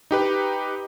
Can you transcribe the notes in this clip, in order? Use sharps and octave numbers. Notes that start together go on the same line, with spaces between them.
D#4 G4 B4